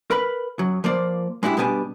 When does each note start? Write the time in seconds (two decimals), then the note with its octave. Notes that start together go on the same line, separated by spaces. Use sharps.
0.11 A#4 B4 B5
0.59 F#2 F#3
0.84 F3 A#3 C5 D5
1.43 G#3 D4 E4 F#4 G4
1.57 B2 G3 B3 D4 G4 G#5